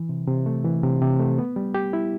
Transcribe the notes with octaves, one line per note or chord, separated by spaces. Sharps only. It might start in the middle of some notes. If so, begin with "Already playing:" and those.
Already playing: E3
C3
C3
A3
E3
C3
C3
A3
B3
G3
G4
E4